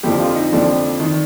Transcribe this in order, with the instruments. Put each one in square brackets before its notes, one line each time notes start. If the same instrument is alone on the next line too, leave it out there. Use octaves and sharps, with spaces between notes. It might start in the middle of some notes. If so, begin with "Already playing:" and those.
[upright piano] F2 D3 F3 G4
F4
D#4
F2 D3 F3 D4
D#3